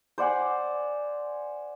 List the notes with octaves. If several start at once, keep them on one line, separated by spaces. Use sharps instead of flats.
C5 D5 F#5 G#5